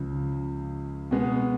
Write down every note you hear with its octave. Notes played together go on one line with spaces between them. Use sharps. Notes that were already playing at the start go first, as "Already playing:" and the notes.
Already playing: C#2 C#3 F3
B2 G#3 B3